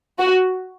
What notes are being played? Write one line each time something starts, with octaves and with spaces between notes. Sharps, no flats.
F#4